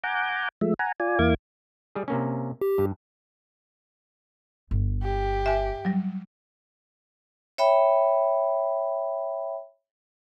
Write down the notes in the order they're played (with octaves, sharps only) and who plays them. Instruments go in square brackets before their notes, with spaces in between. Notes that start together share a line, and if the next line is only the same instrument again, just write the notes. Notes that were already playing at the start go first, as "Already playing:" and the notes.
[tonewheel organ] F#5 G#5 A#5 D6 G6
F3 G#3 A3 E5
F#5 G#5 A#5
F4 D5 G#5
E2 A#3 E4 F5 D6 G#6
[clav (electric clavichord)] G3 G#4
C3 A#3 C#4
[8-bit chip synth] G4
[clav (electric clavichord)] G2
[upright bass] G1
[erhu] G4
[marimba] E5 G#5
F#3 G3
[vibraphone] C#5 E5 G5 B5